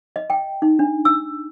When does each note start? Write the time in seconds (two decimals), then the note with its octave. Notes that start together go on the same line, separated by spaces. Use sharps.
0.16 D#5
0.30 G5
0.62 D#4
0.79 D4
1.05 E6